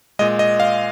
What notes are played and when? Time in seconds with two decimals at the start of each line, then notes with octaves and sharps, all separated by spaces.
0.19 A#2 G#3 D#5
0.39 D#5
0.60 F5